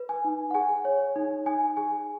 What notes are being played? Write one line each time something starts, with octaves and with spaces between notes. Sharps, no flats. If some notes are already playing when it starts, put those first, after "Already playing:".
Already playing: B4
G#5
D#4
F#5
G#4 G#5
C#5
D#4
D#4 G#5
G#4 G#5